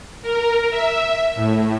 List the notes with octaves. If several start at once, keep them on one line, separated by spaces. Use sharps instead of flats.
A#4
E5
A2